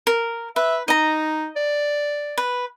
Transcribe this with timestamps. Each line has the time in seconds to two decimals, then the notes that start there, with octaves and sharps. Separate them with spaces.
0.07 A#4
0.56 B4 E5
0.88 D#4 D#5 A#5
1.56 D5
2.38 B4